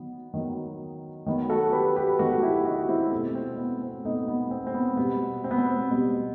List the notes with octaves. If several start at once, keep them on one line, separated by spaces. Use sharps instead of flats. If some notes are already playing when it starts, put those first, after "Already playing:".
Already playing: D#3 F#3 B3
D#3 F#3 B3
D#3 F#3 B3
F#4 A4
G4 B4
G4 B4
D#3 F#3 B3 F#4 A4
E4 G4
D#4 F#4
C4 E4
B2 A3 C4
C4
B3
C4
B2 A3 B3 D#4
B3
C4
C4
B3
B2 G3 B3
C4
B3
C4
B2 G3 B3